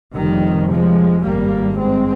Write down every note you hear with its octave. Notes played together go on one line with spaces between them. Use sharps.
F1 F2 C3 D#3 G3
F3 G#3
G#1 G2 G3 A#3
G#3 C4